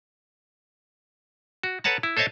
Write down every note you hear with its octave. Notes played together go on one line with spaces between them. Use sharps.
F#4
A4 B4 C#5 F#5 A5 A#5
E4
A4 C5 C#5 D#5 E5 A5